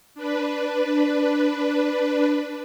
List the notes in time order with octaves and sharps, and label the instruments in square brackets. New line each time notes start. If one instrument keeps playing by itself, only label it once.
[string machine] D4 B4